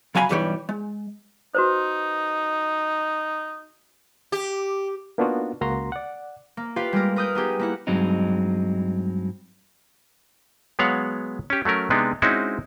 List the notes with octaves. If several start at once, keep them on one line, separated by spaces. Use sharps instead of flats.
C#3 F#3 F5 G#5 A#5 B5
B1 G2 E3 G3 G4 C#5
G#3
D#4 F#4 B4 C5
G4
A#3 B3 D4 D#4 F4 F#4
C#2 A#3 F#4 A#5 C6
D5 F#5
A#3
F4 G4 B4 F5
G3 G#3 A#3 A#4
A#4 B4 D#6 F6 G6
B3 D#4 G4 G#4
A#3 E4 F#5
G2 F#3 G#3 C4 D#4
F#3 G#3 B3 C#5 F5 F#5
C#4 G4
F#3 A3 C#4 A#4
C3 G#3 B3 D4 D#4
G#3 C4 C#4 D#4 E4 F#4